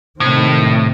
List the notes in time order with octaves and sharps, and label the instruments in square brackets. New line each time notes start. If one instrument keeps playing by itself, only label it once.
[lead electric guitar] A2 [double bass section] C3 D#3 C4